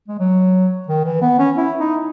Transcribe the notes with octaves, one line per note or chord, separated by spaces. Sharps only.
G#3
F#3
D#3
E3
B3
C#4
E4
D#4